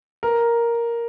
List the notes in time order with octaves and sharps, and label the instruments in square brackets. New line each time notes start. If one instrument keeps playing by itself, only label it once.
[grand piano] A#4